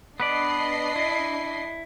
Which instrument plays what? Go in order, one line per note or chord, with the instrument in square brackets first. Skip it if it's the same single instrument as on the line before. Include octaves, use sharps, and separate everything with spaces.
[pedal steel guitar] B3 B4 D5 [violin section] D4 D#5 C7
[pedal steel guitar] E4